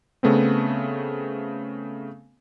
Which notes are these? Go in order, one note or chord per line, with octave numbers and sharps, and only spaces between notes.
C#3 A3 B3 C4